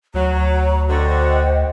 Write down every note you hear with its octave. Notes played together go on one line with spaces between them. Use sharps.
D2 F#3 A#5
D3 F#4 C5 D#5 G5